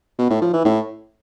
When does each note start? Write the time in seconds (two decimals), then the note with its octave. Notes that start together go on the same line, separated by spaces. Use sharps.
0.18 B2
0.30 A2
0.42 F3
0.53 E3
0.65 A2